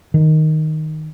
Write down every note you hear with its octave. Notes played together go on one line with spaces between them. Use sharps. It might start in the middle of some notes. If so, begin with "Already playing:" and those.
D#3